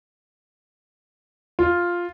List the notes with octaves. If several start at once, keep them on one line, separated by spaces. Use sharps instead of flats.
F4